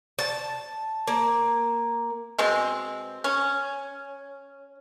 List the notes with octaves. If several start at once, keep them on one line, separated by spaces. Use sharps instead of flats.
A5
A#3
B2 G#3 C4
C#4